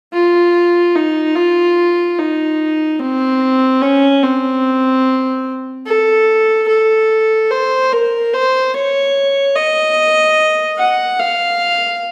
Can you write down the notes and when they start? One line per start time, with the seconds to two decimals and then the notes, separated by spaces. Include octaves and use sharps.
0.13 F4
0.95 D#4
1.36 F4
2.18 D#4
3.00 C4
3.81 C#4
4.23 C4
5.86 A4
6.68 A4
7.51 C5
7.92 A#4
8.33 C5
8.74 C#5
9.55 D#5
10.78 F#5
11.19 F5